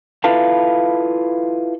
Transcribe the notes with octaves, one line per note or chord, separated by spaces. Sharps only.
E4 F4 A4 B4 F5 A5